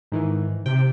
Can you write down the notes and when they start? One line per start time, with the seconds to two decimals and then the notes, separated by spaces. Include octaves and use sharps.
0.12 G#2 D#3 E3
0.66 C3 G5